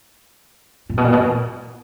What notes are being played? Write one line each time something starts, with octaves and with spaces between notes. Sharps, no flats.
A#2
B2
A#2
B2
A#2